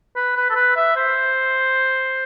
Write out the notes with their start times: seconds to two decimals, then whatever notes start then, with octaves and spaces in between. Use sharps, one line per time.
0.16 B4
0.37 B4
0.50 A4
0.56 B4
0.76 E5
0.97 C5